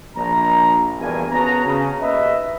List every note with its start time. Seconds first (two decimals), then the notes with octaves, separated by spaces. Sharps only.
0.16 A#1 A#5
1.00 E2 G2 B2 A#3 G#5
1.32 B3 C#4 F#4 G#4 A5 A#5
1.66 C#3
2.01 D#2 B4 D#5 E5